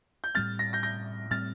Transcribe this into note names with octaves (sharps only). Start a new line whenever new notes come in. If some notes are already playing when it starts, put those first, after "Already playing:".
G6
A2 G3 C4 F6 A6
A#6
G6 A#6
G6 A#6
A2 G3 C4 F6 A6